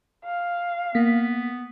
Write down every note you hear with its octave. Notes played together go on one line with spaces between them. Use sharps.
F5
A#3 B3 B6